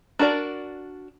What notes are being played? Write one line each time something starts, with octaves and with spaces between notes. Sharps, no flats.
D4 F#4 A#4 D5